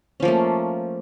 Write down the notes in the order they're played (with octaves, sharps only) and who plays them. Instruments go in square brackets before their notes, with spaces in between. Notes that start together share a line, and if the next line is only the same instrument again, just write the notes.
[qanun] C#4
F3
A#3
A3